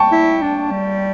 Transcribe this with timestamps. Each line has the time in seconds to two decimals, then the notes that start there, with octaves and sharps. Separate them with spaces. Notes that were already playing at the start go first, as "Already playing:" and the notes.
Already playing: G5 A5 C#6
0.12 E4
0.42 D4
0.72 G3